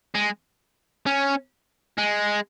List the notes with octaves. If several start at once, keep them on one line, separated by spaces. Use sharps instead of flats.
G#3
C#4
G#3